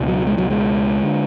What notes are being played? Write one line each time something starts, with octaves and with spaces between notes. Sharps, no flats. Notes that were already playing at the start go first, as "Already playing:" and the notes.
Already playing: C#2 B2
F#3
G#3
F#3
G#3
D3